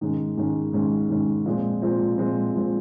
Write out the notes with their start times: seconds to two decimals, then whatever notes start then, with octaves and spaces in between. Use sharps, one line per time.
0.01 G#2 D#3 G#3 C#4
0.37 G#2 D#3 G#3 C#4
0.73 G#2 D#3 G#3 C#4
1.09 G#2 D#3 G#3 C#4
1.46 A#2 F3 G#3 C4
1.82 A#2 F3 G#3 C4
2.18 A#2 F3 G#3 C4
2.54 A#2 F3 G#3 C4